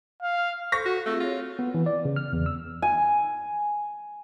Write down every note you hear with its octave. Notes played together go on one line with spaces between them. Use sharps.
F5
A4 C5 C#6 A#6
F#4
A3 C4 F4 G#4
F4 F#4 C#5
B3
E3
D5
C#3
F6
E2
E6
G#5